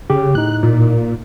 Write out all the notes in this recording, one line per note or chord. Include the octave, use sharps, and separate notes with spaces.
C#3 G4
A2 D#4 F#6
A#2